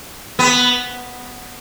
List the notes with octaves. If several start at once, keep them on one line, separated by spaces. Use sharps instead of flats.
B3